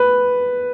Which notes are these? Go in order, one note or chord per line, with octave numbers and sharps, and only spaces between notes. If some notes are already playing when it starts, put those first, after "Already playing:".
Already playing: B4